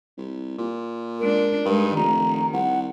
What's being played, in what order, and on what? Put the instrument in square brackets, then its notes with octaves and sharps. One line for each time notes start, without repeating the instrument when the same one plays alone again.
[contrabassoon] C2
A#2
[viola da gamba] G#3 D4 [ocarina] A#4
[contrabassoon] G2 [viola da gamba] G#3 D#4
[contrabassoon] F1 [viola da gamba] D#3 [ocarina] A#5
[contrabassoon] C2 [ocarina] F#5